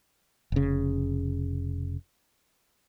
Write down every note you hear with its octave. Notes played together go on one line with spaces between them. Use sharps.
F1 C#3